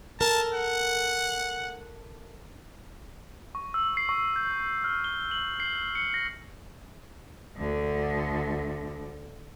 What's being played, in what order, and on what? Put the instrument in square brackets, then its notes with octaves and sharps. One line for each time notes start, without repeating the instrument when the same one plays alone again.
[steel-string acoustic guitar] A4 A#4 [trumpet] A5
[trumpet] F#5
[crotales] C#6
E6
C7
C#6
G6
F6
G7
F#7
C7
C#7
A#6
[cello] D2 D3